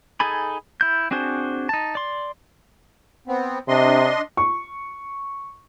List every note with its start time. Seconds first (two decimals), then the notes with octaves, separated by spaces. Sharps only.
0.20 D#4 G#4 A4 G#5 B5
0.81 E4 G6
1.11 C4 D4 F#4 G#4 C5
1.69 D#4 A5
1.95 D5 C6
3.28 B3 C4
3.68 C3 D4 D#5 C6
4.37 C#6